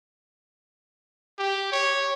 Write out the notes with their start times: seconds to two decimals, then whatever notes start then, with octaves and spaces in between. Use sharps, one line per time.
1.38 G4
1.72 C#5